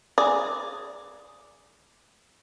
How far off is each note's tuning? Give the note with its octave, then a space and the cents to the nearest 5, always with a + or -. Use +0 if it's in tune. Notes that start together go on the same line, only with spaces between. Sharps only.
G#4 +0 D5 +0